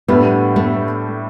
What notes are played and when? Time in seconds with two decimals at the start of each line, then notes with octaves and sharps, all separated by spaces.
0.08 A2 G3 B3 D4 A4
0.56 A3